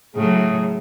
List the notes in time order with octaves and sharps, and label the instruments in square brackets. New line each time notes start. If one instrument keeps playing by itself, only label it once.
[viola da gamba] A2 C#3 F#3 [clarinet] G#4